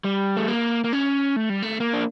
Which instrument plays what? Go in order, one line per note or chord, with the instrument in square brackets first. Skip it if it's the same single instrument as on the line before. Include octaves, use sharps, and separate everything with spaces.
[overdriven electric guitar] G3
A3
A#3
A#3
C#4
A3
G3
A3
A#3
D4